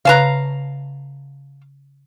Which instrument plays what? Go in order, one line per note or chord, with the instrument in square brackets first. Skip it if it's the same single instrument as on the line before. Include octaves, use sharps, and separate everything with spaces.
[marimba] C#3 B4 F#6 [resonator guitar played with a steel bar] F5 A5 A#5